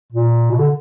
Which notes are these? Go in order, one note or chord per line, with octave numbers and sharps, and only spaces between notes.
A#2
B2
D3